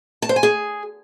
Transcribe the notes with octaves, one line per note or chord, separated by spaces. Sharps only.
A5
C5
G#5
G#4